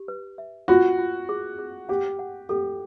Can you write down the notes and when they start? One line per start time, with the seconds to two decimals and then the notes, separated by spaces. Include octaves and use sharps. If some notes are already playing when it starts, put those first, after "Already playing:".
Already playing: G4
0.08 B4
0.38 E5
0.68 F4 F#4
0.99 F4
1.29 G#4
1.59 G#4
1.89 G4 F#5
2.19 F#5
2.49 G4 A4